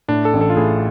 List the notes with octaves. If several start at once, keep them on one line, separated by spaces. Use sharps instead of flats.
A2 D4
A4
A1
A4
F4
A2 G#4